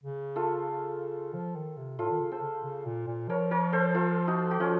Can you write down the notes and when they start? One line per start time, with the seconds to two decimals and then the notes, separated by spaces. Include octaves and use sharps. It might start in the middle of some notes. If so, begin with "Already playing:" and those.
0.03 C#3
0.36 F4 A4
1.34 F3
1.55 D#3
1.77 C3
1.99 A2 F4 A4
2.11 D#3
2.20 C#3
2.32 A4 C5
2.43 C#3
2.64 C#3
2.86 A#2
3.07 A#2
3.29 F3 A#4 C#5
3.51 A#4 C#5
3.73 A4 C5
3.95 F4 A4
4.27 D#4 F#4
4.51 F#4
4.60 F3 C#4 F4